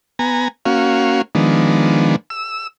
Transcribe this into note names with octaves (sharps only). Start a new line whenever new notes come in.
B3 G#5 A#5
A#3 C#4 F#4 F5
D#3 F3 G#3 B3 D4
E6